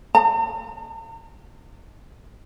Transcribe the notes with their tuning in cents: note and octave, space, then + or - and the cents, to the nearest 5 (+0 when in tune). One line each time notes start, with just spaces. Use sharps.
A#5 -45